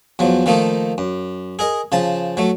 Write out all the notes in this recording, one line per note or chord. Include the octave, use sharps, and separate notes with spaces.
E2 F3 F#3
D#3 F3 A3 A#3 D#4
F#2
G#4 A#4 D#5
C#3 F3 A5
F#3 A3